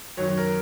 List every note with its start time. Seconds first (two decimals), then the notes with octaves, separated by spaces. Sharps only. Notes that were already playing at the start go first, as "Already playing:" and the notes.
0.17 F#2 D#3 F#3 C#5
0.37 A#4